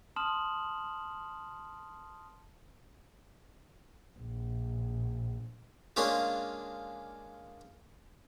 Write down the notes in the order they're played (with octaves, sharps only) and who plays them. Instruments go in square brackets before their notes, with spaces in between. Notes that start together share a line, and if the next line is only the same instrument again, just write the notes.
[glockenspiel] A5 C6 D#6 F6 E7 F#7
[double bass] A#1
[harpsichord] G#3 A#3 C#4 D4 F4